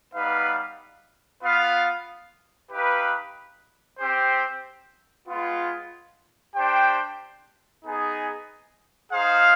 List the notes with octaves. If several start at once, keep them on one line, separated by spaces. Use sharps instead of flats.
G3 B3 D#4 B4 F5
B3 F4 B4 F5
D#4 G4 B4 F5
C4 G4 C5
G#3 B3 F4
D4 G4 C5 G5
B3 D#4 G#4
D#4 G#4 C5 F5